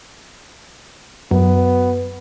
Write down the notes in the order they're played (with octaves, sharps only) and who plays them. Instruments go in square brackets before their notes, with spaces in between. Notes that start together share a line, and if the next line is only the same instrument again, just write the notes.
[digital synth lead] F#2 [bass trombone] B3